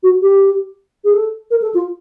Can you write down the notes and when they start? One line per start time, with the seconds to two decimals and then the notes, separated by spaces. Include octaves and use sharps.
0.03 F#4
0.22 G4
1.04 G#4
1.13 A4
1.50 A#4
1.62 A4
1.74 F4